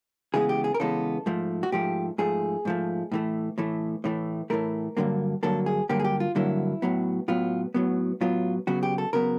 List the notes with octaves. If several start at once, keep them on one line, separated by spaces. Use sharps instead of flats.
C#3 E3 G#3 B3 G#4
G4
G#4
A#4
C#3 E3 G#3 B3 A4
G#2 F3 A3
F#4
G#2 F3 A3 G4
G#2 F3 A3 G#4
G#2 F3 A3
A2 E3 A3
A2 E3 A3
A2 E3 A3
A2 E3 A3 A#4
G2 D3 F#3 A#3
G2 D3 F#3 A#3 A4
G#4
G2 D3 F#3 A#3 G4
G#4
G4
F4
G2 D3 F#3 A#3 E4
A2 F#3 B3
A2 F#3 B3 F4
A2 F#3 B3
A2 F#3 B3 F4
C#3 F#3 B3 F#4
G4
A4
C#3 F#3 B3 A#4